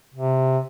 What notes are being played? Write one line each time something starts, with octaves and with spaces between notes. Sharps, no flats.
C3